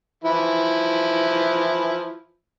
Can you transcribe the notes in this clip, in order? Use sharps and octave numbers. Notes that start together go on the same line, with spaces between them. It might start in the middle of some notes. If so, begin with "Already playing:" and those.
E3 F3 E4